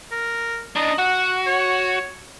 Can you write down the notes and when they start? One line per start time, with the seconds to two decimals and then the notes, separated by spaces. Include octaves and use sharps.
0.12 A#4
0.76 D4 D#4 D#5
0.98 F#4 F#5
1.47 C#5